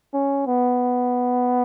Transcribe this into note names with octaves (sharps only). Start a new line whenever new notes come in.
C#4
B3